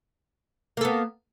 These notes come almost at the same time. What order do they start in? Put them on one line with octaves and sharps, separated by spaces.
A#3 A4 B3